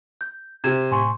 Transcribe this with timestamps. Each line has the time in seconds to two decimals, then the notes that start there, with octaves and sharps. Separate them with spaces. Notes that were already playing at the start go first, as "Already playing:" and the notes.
0.21 G6
0.64 C3 G#6 E7
0.91 A2 G#5 C6 C#6